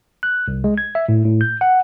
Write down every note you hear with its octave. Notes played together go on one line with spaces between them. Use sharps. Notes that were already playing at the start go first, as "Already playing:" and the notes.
F#6
C2
G#3
G#6
E5
A2
A2
G6
F#5